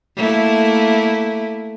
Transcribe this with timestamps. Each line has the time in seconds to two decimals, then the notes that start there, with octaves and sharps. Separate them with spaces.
0.16 A3 A#3 E4